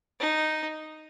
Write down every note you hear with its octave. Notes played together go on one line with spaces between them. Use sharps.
D#4